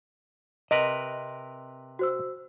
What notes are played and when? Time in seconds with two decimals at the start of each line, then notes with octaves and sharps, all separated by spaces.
0.71 C3 A#4 B4 D#5
1.99 F#4 C5 E6